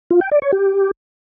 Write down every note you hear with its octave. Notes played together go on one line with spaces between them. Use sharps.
F4
G5
D5
C#5
G4